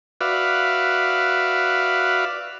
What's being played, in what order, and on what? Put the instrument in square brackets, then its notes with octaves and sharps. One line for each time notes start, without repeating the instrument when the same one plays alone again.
[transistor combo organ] F#4 B4 D5 E5 F5